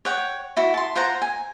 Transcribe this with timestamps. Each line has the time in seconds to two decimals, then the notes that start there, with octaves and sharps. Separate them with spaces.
0.05 C#5 F#5 G5
0.57 E4 F#4
0.74 A5 C6
0.95 F4 C5 F#5 A#5
1.22 G#5